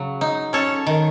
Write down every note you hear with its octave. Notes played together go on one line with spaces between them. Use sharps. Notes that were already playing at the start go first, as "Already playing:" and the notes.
Already playing: C#3 F#3
D#4
C#4 A4 C#5
D#3